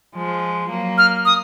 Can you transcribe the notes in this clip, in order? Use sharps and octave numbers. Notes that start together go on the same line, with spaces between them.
F3 G#3
F#3 A#3
F6
D#6